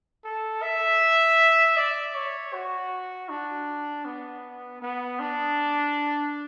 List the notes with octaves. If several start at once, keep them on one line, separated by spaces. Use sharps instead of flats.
A4
E5
D5
C#5
F#4
D4
B3
B3
D4